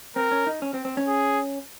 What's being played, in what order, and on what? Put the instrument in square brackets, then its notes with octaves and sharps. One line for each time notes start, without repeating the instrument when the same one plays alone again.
[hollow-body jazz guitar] C4 [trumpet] A#4
[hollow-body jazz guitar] C#4
D#4
C#4
C4
C4
C#4
[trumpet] G#4